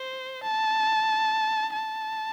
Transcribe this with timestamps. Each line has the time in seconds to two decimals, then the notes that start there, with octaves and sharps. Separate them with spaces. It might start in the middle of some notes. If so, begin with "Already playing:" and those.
Already playing: C5
0.43 A5
1.73 A5